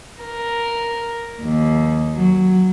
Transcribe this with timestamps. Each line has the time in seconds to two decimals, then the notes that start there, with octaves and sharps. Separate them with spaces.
0.22 A#4
1.41 D#2
2.14 F#3